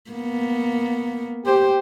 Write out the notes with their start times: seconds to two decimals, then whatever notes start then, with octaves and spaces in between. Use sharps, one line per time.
0.11 A#3 B3
1.46 G4 C5